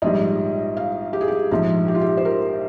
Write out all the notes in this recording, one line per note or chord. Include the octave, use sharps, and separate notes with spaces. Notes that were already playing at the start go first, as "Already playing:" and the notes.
A#1 G#2 G3 D#5
F5
G4
G#4
G4
A#1 G#2 F3
G4
F4
G4
C5
A#4